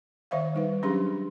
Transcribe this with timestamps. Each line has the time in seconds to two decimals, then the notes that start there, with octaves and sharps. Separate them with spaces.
0.31 D#3 C5 D5 E5 F5
0.54 G3 D#4 B4
0.83 F#3 C#4 D4 G4 G#4 C6